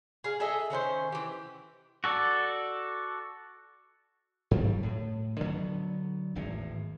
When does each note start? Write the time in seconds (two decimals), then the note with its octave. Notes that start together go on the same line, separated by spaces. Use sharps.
0.24 G#4 F5
0.40 G#4 A4 D#5 E5
0.70 D#3 C#4 B4 C5
1.12 E3 G4
2.04 F#4 A4 D5
4.51 G2 F#3 G3
4.83 A2
5.41 D3 F#3 G#3 B3
6.35 G#1 E2 A2